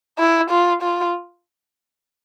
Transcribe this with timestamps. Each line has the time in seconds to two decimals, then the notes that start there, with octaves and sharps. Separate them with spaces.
0.18 E4
0.50 F4
0.82 F4